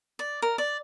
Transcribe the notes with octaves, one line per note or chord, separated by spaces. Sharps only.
D5
A#4
D5